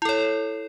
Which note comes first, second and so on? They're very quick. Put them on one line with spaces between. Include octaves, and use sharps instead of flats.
E4 A4 C#5